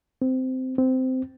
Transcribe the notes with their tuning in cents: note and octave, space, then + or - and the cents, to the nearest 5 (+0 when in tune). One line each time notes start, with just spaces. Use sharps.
C4 -15
C4 -15